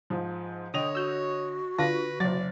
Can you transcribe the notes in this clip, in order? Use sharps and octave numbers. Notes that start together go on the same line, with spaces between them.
G#2 F3
D3 C#5 D#5 G5 D#6 F7
F#4 E6 G6
D3 D4 F4 B4 A#6
F#1 F#3 D5 A6